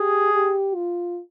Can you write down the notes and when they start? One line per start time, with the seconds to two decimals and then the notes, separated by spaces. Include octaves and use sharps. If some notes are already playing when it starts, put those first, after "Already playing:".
Already playing: G4 G#4
0.34 G4
0.75 F4